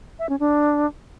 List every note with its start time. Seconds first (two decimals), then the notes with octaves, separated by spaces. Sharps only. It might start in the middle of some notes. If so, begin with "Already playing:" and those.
0.19 E5
0.29 C#4
0.39 D4